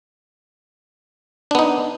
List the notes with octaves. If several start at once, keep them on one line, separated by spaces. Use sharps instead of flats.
B3 D4 D#4